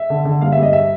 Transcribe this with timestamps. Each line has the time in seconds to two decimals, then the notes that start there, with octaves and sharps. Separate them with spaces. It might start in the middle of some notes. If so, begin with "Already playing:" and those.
Already playing: E5
0.10 D3
0.25 D3
0.41 G2 F5
0.52 G2 E5
0.63 D#5
0.73 E5